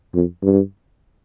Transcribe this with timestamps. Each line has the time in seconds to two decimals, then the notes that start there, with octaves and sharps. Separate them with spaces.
0.14 F2
0.43 G2